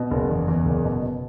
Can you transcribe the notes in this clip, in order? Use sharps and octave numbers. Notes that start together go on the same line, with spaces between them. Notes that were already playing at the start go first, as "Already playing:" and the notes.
Already playing: B2
F#1
E2
E2
F#1
B2
B2